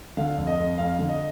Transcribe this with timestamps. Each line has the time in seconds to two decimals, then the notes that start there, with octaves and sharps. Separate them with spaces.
0.17 D3 F5
0.37 F2
0.47 D#5
0.58 F2
0.78 F2 F5
0.99 D3
1.09 D#5